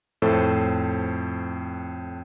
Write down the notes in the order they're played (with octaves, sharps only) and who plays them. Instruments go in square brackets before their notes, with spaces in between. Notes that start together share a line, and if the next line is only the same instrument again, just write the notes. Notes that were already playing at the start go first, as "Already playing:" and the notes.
[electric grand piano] F2 A2 A4 C5